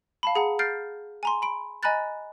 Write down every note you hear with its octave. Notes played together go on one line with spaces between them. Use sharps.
F5 A5 B5
G#4 F#5 A#5
F6 G6 A6 C7 D7
G#5 A#5 C6
B5 D7
D#5 G#5 A#5 B5 F#6 A6